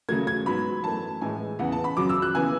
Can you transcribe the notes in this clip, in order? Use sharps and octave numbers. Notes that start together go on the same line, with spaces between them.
C#3 F#3 A3 G#6
G#6
G#2 F#3 B3 B5
F#2 E3 A3 A5
A2 E3 G#3 G#5
E2 C#3 E3 B3 F#5
A5
B5
F#2 C#3 F#3 D6
E6
F#6
C#3 E3 B3 G#5